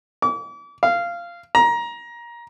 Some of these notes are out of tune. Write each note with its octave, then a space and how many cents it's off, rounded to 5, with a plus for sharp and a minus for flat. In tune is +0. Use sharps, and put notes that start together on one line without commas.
D6 -40
F5 -15
A#5 +20